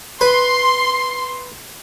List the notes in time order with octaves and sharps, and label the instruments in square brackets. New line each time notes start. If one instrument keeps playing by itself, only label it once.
[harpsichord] B4 [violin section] C6